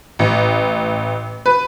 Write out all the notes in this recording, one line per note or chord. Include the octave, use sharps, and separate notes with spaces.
A1
B4